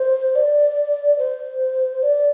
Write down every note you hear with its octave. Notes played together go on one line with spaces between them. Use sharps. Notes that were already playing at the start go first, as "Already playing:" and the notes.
Already playing: C5
D5
C5
D5